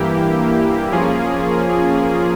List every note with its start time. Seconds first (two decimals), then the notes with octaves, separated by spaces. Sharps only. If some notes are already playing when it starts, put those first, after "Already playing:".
Already playing: G2 E3 A#3 E4 G4
0.92 F3 A#3 C#4 F4 G#4